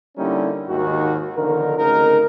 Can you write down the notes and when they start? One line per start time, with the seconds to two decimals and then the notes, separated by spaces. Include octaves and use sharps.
0.18 D3 G3 A#3 C#4 D#4 E4
0.69 D#2 G#2 D#3 F#4
1.36 B1 D3 D#3 F3 A#4
1.78 G#1 D2 C#3 D#4 A#4